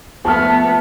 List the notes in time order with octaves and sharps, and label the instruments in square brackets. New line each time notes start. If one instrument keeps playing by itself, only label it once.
[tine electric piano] F3 A3 [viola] B3 [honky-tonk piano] A5 F6